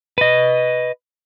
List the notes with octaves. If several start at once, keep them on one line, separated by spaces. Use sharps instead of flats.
B4 D#5